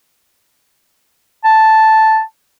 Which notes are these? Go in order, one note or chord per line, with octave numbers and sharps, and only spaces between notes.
A5